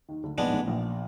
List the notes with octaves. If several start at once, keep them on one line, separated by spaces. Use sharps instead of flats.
D#2 D#3
D2 D3
A#1 A#2 G#3 B3 D4
G#2
A1 A2
A#1 A#2